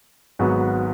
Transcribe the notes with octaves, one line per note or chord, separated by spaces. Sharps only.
G#1 G#2 F#3 B3 F#4